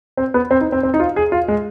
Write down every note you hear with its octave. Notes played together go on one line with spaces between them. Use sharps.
C4
B3
C4
D#4
C4
C4
D#4
F4
G#4
F4
G#3